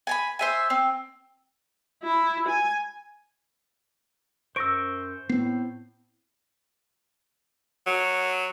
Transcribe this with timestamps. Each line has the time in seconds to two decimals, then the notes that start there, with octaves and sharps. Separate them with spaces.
0.07 G#5 A5 B5
0.39 C5 E5 G#5
0.70 C4
2.04 E4
2.49 G#5
4.56 F#2 C5 C#6 E6 A#6 D7
5.29 A2 B3 C4 C7
7.86 F#3